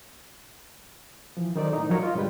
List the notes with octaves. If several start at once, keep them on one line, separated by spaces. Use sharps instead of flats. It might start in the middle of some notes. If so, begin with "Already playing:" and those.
E3 F3
D#3 F#3 D#4 A4 C5 D5
A2 D#4
F3 F#3 F#4 A#4 C#5
F4 D#5
G#2 D3 G3 B4 G5